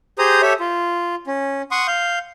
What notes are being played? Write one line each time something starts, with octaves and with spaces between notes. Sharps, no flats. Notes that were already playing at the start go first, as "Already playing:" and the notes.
G4 G#4 C5 A#5 D#6
G4 A4 C#5 E5
F4
C#4
F#5 C6 C#6 D#6
F5 G6